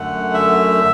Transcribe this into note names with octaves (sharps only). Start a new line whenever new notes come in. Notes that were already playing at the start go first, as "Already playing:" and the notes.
Already playing: F#2 D3 A3 F#5
E5